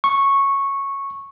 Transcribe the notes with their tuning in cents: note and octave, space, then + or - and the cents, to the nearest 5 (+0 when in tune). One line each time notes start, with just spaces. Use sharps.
C#6 -10